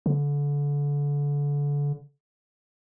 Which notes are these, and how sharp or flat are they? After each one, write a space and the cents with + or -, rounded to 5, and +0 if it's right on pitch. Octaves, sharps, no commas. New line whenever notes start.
D3 -30